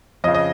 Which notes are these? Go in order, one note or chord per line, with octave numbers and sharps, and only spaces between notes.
F2 C#3 D#5
D#5